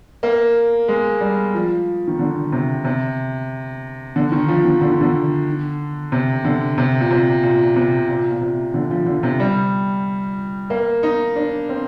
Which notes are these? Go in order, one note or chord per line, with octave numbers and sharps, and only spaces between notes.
A#3
G#3
G3
F3
D#3
D3
C3
C3
D3
D#3
F3
D#3
D3
D#3
D3
C3
D3
C3
A#2
C3
A#2
C3
A#2
A#2
C3
D3
F3
D3
C3
G3
A#3
D#4
D4
C4